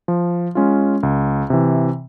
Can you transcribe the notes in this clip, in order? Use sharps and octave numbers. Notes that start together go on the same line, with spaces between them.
F3
G#3 C#4 F4
C#2
C3 E3